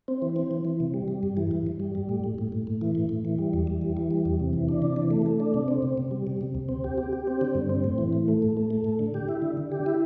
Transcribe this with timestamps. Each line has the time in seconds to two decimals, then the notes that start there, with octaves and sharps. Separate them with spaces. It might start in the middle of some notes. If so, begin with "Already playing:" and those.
0.08 C4
0.22 E3
0.36 C4
0.51 E3
0.65 E3
0.80 C3
0.94 G3
1.08 G3
1.23 G2
1.37 E3
1.51 G2
1.66 G2
1.80 G3
1.95 G3
2.09 A2
2.24 A2
2.38 A2
2.52 A2
2.67 A2
2.81 E3
2.95 A2
3.09 A2
3.25 E3
3.38 G3
3.53 E2
3.67 G3
3.82 E3
3.97 E3
4.11 G3
4.25 E2
4.40 C3
4.53 E3
4.69 D4
4.82 C3
4.96 E3
5.11 A3
5.26 A3
5.40 D4
5.54 C3
5.68 C4
5.82 C3
5.97 C3
6.11 G3
6.27 C3
6.41 C3
6.55 D2
6.69 C4
6.84 G4
6.98 G4
7.13 G4
7.27 C4
7.41 D3
7.55 G2
7.69 C4
7.84 A2
7.98 E3
8.13 A2
8.28 A3
8.42 A2
8.57 A3
8.70 A3
8.84 A2
8.99 D3
9.14 G4
9.28 E4
9.42 D3
9.57 D3
9.72 G4
9.86 E4